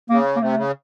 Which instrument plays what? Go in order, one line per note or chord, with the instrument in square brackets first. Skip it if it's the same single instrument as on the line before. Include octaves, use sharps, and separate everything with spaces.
[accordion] C#3 [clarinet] A#3
[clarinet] A#3
[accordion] C3 [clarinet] A3
[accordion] C#3